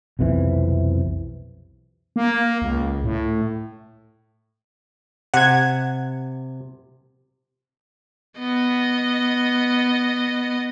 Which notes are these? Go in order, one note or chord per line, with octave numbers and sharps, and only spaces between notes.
B1 F2 C3 E3
A#3
C#2
A2
C3 F#5 G#6
B3 D#5